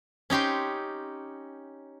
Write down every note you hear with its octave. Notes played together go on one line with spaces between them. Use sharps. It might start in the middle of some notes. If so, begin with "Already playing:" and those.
C#4 D#4 G4 C6